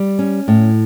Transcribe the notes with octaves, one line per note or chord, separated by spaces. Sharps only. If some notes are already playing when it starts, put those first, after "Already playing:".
Already playing: G3
C#4
A2